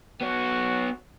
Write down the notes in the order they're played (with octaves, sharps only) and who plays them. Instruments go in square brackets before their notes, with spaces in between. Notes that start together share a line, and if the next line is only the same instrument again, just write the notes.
[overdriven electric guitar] B3 C#5 [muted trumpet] F#4